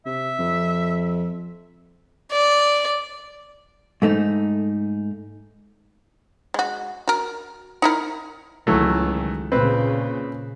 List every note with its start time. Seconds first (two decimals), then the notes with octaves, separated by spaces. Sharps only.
0.06 C3 E5
0.39 F2
2.32 D5
4.02 G#2 A3 D#4
6.54 G#3 F#4
7.08 F#4 A#4
7.82 D#4 E4 A#4
8.67 C#2 D#3 E3 F#3 A3
9.52 A#2 C#3 C4 B4